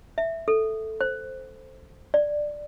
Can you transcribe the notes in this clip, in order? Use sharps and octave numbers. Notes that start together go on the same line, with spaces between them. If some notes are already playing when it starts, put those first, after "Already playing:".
E5
A4
C5
D5